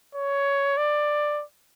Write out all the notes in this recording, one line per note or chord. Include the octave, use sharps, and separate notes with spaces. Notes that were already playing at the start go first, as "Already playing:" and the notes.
C#5
D5